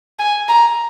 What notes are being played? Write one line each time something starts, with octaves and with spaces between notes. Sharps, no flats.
G#5
A#5